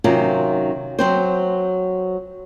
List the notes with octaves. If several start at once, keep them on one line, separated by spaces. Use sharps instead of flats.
C3 D#3 F#3 C#4 F4
F#3 C4 C5